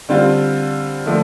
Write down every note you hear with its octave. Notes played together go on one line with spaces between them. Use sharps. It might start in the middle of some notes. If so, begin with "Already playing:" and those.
D3 G3 C4 F4
D3 F3 A3